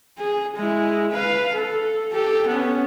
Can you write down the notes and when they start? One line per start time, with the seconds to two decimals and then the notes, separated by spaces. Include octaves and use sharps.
0.18 G#4
0.56 G#3 E4
1.12 B4 F5
1.55 A4
2.13 G4 A4
2.47 B3 C#4